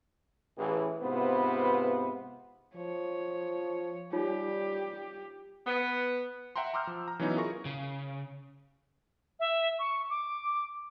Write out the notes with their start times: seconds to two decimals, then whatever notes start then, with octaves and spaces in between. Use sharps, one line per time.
0.58 A1 E3 G#4
1.02 G#2 C3 B3 F4 B4 C5
2.76 F3 C#5
4.13 G3 D#4 F4 G4 C#5
5.66 B3
6.56 E5 F#5 G5 A#5 C6
6.74 A#5 C6 D6 E6 F6 G6
6.87 F3
7.08 A#5
7.19 E3 F#3 B3 C#4 D#4 E4
7.36 F4 G#4 A#4 C#6 A#6
7.65 C#3
9.40 E5
9.79 C#6
10.10 D6